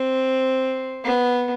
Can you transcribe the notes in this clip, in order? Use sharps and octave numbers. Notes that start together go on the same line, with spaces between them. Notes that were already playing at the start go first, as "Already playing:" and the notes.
Already playing: C4
B3